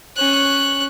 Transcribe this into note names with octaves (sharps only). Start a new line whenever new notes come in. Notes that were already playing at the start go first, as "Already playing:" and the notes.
C#4 F#6